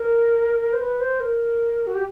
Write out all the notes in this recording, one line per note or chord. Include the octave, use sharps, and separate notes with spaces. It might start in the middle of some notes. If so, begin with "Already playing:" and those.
Already playing: A#4
C5
B4
C5
A#4
F#4
G4